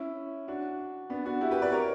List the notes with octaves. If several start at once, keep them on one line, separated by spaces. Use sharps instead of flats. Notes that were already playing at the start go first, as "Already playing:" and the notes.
Already playing: C#4 E4
D4 F#4
B3 D4
D4 F#4
E4 G4
G4 B4
B4 D5
A#4 C#5